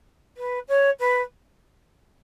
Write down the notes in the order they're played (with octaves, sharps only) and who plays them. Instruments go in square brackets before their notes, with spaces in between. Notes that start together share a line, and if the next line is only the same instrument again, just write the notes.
[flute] B4
C#5
B4